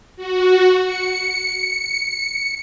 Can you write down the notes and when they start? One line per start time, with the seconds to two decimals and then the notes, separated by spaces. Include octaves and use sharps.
0.17 F#4
0.79 C#7